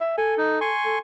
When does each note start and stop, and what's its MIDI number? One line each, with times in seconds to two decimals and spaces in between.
0.01 0.17 76
0.18 0.71 69
0.18 0.34 80
0.38 0.59 63
0.61 0.99 80
0.61 0.99 84
0.61 0.99 85
0.85 0.97 69